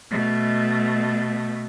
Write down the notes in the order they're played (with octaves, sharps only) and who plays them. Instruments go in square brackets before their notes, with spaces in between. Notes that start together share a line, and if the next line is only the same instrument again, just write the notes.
[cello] B2 A3